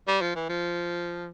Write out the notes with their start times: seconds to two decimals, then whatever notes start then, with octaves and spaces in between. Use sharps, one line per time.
0.07 G3
0.22 F3
0.35 E3
0.49 F3